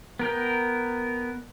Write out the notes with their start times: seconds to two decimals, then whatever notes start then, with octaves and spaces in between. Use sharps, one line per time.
0.19 B3 A#4 G5